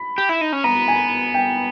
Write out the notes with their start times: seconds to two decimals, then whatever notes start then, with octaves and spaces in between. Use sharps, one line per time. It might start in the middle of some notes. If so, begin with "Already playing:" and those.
Already playing: B5
0.18 G4
0.29 E4
0.41 D#4
0.53 C#4
0.64 B3 A#5
0.88 G#5
1.34 G5